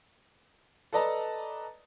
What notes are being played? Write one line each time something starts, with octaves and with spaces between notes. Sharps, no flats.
A4 B4 D5 D#5 A5 A#5